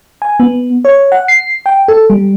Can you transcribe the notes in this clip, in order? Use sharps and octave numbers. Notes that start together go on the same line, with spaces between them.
G#5
B3
C#5
F#5
C7
G5
A4
G3